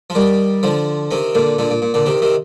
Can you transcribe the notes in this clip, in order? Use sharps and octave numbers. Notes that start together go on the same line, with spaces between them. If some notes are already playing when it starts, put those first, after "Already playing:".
F3
D#3 G3
D3 F3
C3 D#3
A#2 D3
A#2 D3
A#2
A#2
A#2 D3
C3 D#3
C3 D#3